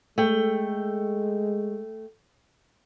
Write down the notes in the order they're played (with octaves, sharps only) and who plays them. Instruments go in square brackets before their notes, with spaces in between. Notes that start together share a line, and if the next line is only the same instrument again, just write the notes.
[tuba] G#3 [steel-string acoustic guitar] A3 G5